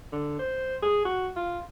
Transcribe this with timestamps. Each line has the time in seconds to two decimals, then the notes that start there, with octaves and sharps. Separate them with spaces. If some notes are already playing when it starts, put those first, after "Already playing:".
0.12 D3
0.39 C5
0.83 G#4
1.05 F#4
1.36 F4